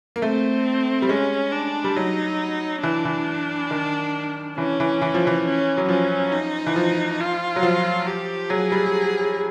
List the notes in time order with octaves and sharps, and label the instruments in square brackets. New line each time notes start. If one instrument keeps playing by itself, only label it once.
[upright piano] A#3
[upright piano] A3 [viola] C4
[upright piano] G3
[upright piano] G#3 [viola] C#4
[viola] D4
[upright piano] G3
[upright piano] F#3 [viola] D#4
[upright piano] E3 [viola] D4
[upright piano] E3
D#3
[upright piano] E3 [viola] C#4
[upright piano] E3
E3
F3
E3
[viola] C#4
[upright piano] F#3
[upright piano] F3 [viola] C#4
[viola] D#4
[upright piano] E3
F3
[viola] F4
[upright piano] F#3
F3
[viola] G4
[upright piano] F#3 [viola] G#4
[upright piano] G3